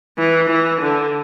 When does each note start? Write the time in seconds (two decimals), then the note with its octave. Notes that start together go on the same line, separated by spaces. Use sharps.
0.18 E3
0.50 E3
0.81 D3